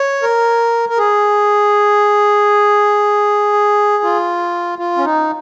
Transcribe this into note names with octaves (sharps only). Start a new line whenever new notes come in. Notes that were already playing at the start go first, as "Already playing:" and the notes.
Already playing: C#5
A#4
A#4
G#4
F4
F4
C#4
D#4